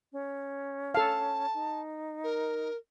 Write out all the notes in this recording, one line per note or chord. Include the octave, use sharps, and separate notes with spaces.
C#4
A4 F5 A5
D#4
A#4